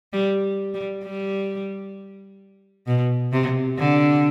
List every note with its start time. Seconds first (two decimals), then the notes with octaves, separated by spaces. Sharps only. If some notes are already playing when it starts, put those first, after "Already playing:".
0.13 G3
0.74 G3
1.05 G3
2.87 B2
3.32 C3
3.78 D3